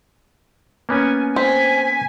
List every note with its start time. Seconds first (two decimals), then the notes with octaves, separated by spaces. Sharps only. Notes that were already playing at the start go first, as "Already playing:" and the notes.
0.89 A#3 B3 C#4 G#5
1.36 C4 G#5 B6